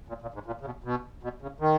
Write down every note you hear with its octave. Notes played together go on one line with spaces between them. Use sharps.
A#2
A#2
G#2
A#2
C#3
B2
B2
B2
C#3
D#3